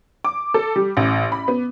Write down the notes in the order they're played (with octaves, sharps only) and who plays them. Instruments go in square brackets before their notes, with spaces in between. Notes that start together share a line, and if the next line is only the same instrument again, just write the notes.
[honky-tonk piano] D6
A4
G3
A1
B5
B3